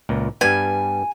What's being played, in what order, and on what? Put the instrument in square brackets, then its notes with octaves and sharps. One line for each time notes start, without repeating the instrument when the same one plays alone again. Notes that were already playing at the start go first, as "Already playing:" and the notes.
[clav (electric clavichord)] C#2 A#2
[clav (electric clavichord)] G2 G3 B3 [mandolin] G#5